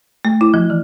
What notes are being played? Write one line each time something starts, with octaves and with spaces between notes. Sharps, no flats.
A3
E4
F3
E3